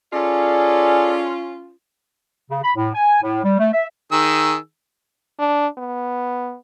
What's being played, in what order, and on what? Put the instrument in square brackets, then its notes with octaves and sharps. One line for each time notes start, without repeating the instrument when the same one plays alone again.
[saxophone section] C#4 F4 [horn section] G#4 A4 D5
[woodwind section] C#3
B5
A2
G#5
A2
G3
A3
E5
[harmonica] D#3 G#4 E6
[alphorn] D4
B3